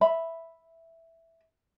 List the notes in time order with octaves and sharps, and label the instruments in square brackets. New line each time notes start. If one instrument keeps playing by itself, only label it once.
[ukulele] E5 B5